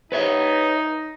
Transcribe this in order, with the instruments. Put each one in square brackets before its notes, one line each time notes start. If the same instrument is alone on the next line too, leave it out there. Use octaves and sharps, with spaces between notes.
[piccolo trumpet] D#4 [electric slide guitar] B4 C#5 E5